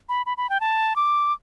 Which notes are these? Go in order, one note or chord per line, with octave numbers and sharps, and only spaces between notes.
B5
B5
B5
G5
A5
D6